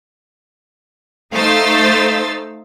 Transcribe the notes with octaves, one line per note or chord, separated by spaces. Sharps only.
A3 D#4 C5 F5 E6 A6